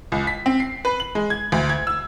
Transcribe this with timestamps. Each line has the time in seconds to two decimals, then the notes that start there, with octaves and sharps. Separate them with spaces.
0.12 C#2
0.27 B6
0.46 C4
0.60 C7
0.85 B4
1.00 F#7
1.15 G#3
1.30 G#6
1.52 D2
1.69 G#6
1.87 E6